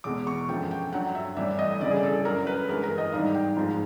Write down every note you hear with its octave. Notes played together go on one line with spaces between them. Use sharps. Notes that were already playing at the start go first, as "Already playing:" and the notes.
E2 B2 G#3 D6
C#6
F#2 D3 F3 G#3 G5
G5
G2 D3 F#3 F#5
E5
A2 E3 G3 E5
D#5
D2 C#3 E3 G3 D5
G#4
A4
A4
F#2 D3 F#3 A#4
B4
G2 E3 G#3 A#4
A#4
D#5
G#2 D#3 G3 F5
G5
G#2 F3 G#3